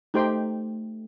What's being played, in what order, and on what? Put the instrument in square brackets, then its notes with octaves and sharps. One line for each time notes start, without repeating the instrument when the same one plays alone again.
[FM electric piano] A3 [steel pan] D#4 G4 C5 G5 C6